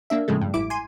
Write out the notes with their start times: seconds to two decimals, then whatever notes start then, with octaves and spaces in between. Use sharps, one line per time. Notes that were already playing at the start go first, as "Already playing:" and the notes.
0.10 A#3 D4 E5
0.28 A2 C#3 F3 G#3 A3
0.41 G2
0.54 A1 E4 D6 D7
0.70 G#5 C6 D#7